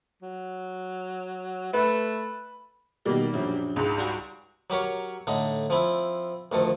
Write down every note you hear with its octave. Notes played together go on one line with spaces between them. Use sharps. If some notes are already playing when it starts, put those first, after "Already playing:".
F#3
A3 B4
B2 D#3 G3 A#3
A#1 F#2
C#2 G#2
G3 F#4
F#3 G4 A#4 C#5
A2 D3 D#4
F3 C4 E4
D2 D#3 F3 A4